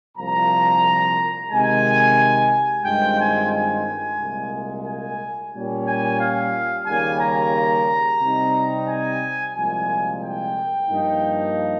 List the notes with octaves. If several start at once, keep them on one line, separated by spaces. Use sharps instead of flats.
C2 A#2 F3 A#5
C3 D#3 G#3 G#5
G2 D#3 G#3 C4 F4 G5
G#5
G#5
C2 A#2 G#3
G#5
A#2 G3 C#4
G#5
F5
D#2 C#3 G3 A#3 G#5
A#5
C3 G3 C4 D#4
G#5
C2 A#2 F3 G#3 G#5
G5
G2 F3 A#3 D#4